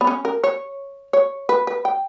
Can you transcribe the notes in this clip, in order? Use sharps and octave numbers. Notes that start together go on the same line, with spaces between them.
B3
C#4
A#4
C#5
C#5
B4
B4
G5